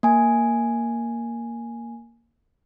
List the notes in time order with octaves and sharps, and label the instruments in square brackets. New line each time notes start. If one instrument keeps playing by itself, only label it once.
[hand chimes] A#3 G#5